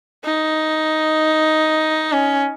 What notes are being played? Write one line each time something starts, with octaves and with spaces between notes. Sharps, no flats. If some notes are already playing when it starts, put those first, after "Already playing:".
D#4
C#4